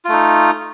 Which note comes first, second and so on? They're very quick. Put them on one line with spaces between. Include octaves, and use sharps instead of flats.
F4 A3 D#4